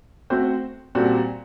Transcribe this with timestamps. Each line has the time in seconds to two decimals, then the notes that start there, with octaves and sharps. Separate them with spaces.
0.30 A3 C4 F#4 C5
0.95 A#2 G3 C4 F#4 A4